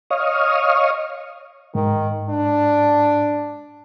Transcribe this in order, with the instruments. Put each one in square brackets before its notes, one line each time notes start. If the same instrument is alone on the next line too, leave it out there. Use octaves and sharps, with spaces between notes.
[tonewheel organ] C#5 D#5 F5 C#6 D#6 F6
[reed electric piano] G#2 [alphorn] D#3
[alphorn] D4